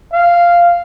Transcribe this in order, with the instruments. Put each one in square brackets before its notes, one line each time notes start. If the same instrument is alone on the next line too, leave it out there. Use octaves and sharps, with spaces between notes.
[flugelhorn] F5